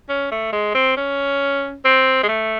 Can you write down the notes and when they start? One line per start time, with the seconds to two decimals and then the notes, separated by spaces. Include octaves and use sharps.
0.09 C#4
0.31 A3
0.52 G#3
0.74 C4
0.97 C#4
1.85 C4
2.23 G#3
2.28 A3